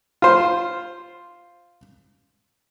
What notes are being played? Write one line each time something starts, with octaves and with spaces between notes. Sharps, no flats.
F4 C5